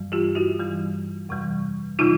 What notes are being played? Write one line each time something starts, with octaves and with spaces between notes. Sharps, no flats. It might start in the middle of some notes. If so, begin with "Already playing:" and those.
Already playing: G2 E3 G3
F4 G4
E4 F#4
G2 E3 G3
F2 C3 E3 G3
C3 E3 G3 D#4 F4